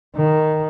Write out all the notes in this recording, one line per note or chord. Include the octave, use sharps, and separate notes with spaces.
D#3